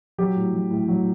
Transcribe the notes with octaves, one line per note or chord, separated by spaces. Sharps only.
F#3 G4
A2
F#3
A2
F#3